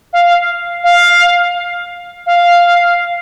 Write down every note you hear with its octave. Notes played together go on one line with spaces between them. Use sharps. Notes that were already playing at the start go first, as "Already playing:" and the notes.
F5
F5
F5